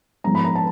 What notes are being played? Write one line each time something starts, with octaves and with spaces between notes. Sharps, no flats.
G#2 F3 G#3 B3 A#5
B5
A#5
A5